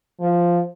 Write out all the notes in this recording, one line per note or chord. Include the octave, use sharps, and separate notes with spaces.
F3